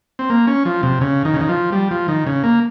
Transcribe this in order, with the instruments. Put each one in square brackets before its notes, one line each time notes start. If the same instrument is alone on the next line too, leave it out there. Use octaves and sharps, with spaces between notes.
[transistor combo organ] C4
A#3
C#4
F3
C3
C#3
D#3
C#3
D#3
F3
G3
F3
D#3
C#3
A#3